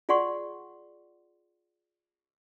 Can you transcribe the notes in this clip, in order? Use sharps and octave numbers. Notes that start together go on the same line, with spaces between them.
F4 G#4 D5 F#5 C6 C#6